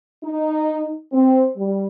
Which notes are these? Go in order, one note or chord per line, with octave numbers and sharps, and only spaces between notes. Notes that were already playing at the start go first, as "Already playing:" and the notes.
D#4
C4
G3